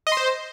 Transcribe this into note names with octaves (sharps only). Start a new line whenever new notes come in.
D#5
C6
C5